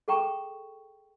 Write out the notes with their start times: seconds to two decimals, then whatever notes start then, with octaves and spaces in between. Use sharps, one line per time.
0.08 G#4 A4 G5 A#5 C#6